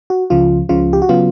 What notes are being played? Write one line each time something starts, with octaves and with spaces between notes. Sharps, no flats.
F#4
C#2 C#3 F3 F4
C#2 C#3 F3 F4
G4
F#4
C#3 F#3 B3 F4